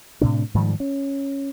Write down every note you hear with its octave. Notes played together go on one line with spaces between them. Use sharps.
A2 C3 D4
G#2 D#3 F3 G3
C#4